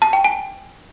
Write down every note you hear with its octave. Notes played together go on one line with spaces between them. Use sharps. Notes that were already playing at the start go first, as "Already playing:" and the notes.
A5
G5
G#5